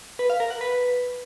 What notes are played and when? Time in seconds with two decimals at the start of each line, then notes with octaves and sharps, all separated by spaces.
0.19 B4
0.30 F5
0.40 A#4
0.50 F#5
0.61 B4